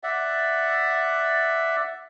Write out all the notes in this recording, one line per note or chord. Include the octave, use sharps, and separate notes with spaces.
D5 E5 F#5